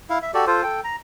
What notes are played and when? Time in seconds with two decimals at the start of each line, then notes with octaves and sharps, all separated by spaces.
0.10 E4 F5
0.22 E5
0.34 F#4 G4 A4 D5
0.47 F4 A4 C5
0.63 A4 G5
0.84 A#5